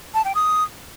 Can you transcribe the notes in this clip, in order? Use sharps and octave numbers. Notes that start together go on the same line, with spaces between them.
A5
G5
D#6